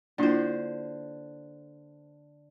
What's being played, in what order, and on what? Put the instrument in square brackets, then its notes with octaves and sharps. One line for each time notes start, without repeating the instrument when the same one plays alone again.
[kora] D3 C5 [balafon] A#3 E4 F4